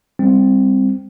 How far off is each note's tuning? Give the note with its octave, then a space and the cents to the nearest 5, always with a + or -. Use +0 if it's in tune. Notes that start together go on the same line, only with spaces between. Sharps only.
G3 +20 C4 +0